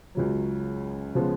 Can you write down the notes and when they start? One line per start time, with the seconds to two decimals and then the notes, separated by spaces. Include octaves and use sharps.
0.15 C#2 C#3 F#3
1.15 C#3 F3 G#3 B3